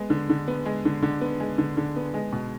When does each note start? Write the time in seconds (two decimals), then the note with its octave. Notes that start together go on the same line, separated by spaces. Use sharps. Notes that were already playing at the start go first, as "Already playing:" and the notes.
Already playing: G#3 B3
0.10 D3
0.29 D3
0.48 B3
0.65 G#3
0.85 D3
1.02 D3
1.21 B3
1.40 G#3
1.58 D3
1.77 D3
1.96 B3
2.14 G#3
2.33 B2